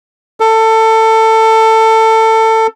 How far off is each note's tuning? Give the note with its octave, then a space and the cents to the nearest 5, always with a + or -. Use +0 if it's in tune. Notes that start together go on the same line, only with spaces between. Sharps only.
A4 +20